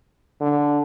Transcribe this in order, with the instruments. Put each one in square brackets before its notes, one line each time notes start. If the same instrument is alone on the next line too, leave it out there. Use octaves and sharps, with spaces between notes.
[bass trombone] D3